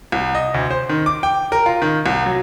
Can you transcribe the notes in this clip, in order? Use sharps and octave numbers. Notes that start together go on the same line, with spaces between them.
C2
D#5
D2
C5
D#3
D6
G5
A#4
F4
D#3
C2
F#3